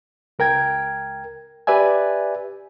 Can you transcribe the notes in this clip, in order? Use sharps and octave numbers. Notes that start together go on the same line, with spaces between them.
C#2 A#4 G5 G#6
G4 B4 D5 E5 G#5